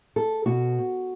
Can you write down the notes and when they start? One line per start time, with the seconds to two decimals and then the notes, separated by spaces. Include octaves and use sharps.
0.16 A4
0.46 B2 F#4